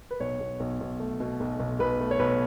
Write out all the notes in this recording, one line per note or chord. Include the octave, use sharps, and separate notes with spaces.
B4
B1 C#5
B1
B1
B1
A3
B2
B1
B1
B1 B4
A3
C#5
B1 B4